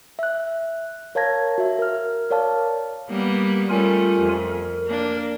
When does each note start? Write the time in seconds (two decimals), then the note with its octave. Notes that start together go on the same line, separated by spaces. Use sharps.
0.19 E5 F#6
1.15 A#4 C#5 F5 A5 G#6 A#6
1.58 F#4 E5
1.79 A#4 F6
2.30 A#4 C#5 D5 F5 A5 F6
3.09 G3 A#3 B3
3.70 G3 A3 C#4 F4 A#4 G#5
4.21 F2
4.51 A#4
4.86 A#3 D4